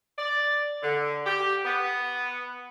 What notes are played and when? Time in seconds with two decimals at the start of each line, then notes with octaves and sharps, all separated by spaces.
0.18 D5
0.82 D3
1.26 G4
1.65 B3